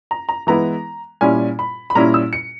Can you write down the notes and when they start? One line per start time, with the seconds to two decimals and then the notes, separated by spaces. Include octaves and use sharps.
0.11 A#5
0.29 A#5
0.47 E3 G#3 B3 E4 A#5
1.21 A#2 G3 C#4 E4 G#5
1.59 B5
1.90 B5
1.95 A#2 G3 C#4 E4 A#5
2.14 E6
2.33 C#7